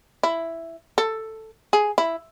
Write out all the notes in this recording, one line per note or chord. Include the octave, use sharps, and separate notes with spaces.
E4
A4
G#4
E4